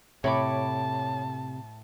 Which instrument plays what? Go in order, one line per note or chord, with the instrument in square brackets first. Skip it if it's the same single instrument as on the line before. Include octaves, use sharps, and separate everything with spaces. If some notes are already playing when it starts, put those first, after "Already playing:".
[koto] A2 [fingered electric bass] C3 [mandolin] C#5 B5 D6 [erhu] A5